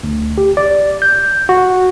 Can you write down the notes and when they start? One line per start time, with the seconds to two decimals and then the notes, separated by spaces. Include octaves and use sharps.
0.03 D2
0.38 G4
0.57 D5
1.02 G6
1.49 F#4